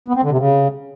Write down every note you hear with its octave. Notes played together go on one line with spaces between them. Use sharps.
B3
C4
D3
C3
C#3